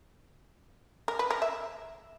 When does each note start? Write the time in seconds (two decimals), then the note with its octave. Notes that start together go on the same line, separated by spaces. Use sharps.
1.08 A#4
1.19 B4
1.31 A#4
1.42 E5